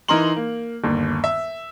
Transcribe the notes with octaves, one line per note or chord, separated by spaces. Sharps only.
E3 D#4 A#4 A#5 C6 F#7
A#3
G1 D#2
E5